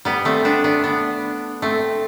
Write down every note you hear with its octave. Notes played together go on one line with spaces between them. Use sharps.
G3 B3
A3 C4
B3 D4
B3 D4
B3 D4
A3 C4